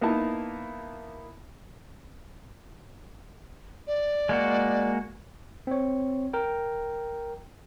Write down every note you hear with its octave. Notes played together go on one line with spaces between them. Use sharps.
A#3 B3 D#4 E4 A5
D5
G#3 A#3 F#4
C4 C#5
A#4 G5